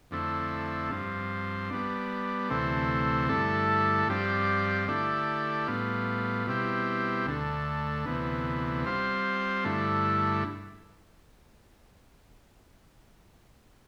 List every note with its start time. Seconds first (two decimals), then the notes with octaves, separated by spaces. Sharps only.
0.11 F2 D3 A3 C4 E4
0.91 G2 F3 C4
1.70 G3 B3 D4
2.50 D2 C3 E3 A3 C4
3.29 G2 D3 A3 E4 A4
4.08 G2 F3 C4 G4 D5
4.88 D3 A3 E4 G4 D5
5.67 A2 G3 B3 F4
6.47 B2 G3 C4 E4 G4
7.26 D2 D3 A3
8.05 D2 C3 E3 B3
8.85 G3 C4 F4 C5
9.64 G2 D3 A3 E4